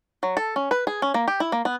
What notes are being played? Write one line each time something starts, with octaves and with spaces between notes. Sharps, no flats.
F#3
A4
C#4
B4
G#4
C#4
A#3
G4
E4
A#3
B3